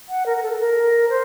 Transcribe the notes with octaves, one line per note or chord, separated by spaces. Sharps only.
F#5
A#4
A#4
A4
A4
A#4
C5